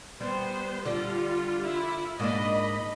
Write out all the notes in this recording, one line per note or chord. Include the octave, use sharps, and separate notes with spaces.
G3 B3 C5
D3 G3 D4 F4
E4 F4
G#2 A#3 D4 D#5 B5